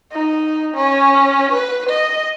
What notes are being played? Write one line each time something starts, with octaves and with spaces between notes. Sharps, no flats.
D#4
C#4
B4
D#5